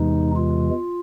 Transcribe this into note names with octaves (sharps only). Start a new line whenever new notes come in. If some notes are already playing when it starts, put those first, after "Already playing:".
Already playing: E2 C3 E3 G#3 D#4
F4